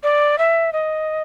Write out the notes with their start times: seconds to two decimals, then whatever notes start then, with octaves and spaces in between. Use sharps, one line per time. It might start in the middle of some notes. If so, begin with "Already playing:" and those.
0.03 D5
0.38 E5
0.73 D#5